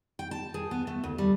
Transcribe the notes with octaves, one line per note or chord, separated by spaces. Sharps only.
G5
A5
G#4
B3
A3
D2
G3